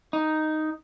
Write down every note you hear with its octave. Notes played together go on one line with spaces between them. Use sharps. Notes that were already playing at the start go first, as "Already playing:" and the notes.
D#4